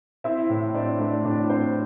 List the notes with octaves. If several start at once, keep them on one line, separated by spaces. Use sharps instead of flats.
C4 E4 E5
A2
C4 D4 D5
A3 D4 D5
A2 D4 D5
C4 C5